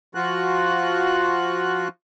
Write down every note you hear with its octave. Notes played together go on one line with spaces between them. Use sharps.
F3 F4 F#4 F#6